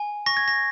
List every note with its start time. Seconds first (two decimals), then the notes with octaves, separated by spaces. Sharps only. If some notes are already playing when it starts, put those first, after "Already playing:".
Already playing: G#5
0.26 C#6 A#6
0.37 G#6
0.48 A#6